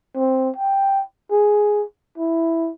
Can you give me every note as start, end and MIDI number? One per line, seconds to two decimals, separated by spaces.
0.16 0.50 60
0.57 1.02 79
1.32 1.84 68
2.18 2.70 64